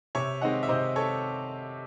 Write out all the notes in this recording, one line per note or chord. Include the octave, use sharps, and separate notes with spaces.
C3 C#5 E5
D#3 G#3 C4 D#5 F#5
E5
C3 C5 D#5
A4 C#5